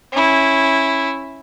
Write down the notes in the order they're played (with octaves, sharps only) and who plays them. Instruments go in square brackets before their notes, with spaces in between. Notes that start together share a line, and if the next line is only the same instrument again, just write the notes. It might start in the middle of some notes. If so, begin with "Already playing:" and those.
[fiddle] C#4 E4